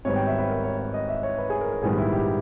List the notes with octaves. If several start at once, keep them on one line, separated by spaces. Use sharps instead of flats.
G#1 G#2 G3 B3 C#5
G5
E5
B4
A#4
C#5
C#5
D#5
E5
C#5
B4
G#4
A#4
A#4
A#1 G#2 D#3 G3 B3 G#4
E4
G4